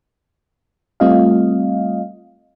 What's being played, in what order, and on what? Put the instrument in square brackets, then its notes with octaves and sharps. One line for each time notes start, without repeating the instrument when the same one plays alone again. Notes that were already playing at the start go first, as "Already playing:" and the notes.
[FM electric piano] G3 A3 C4 F4 D#5 F5